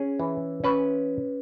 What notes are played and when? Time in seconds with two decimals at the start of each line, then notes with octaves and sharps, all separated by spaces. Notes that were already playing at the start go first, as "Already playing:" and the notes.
Already playing: C#4 G#4
0.19 E3
0.64 C#4 B4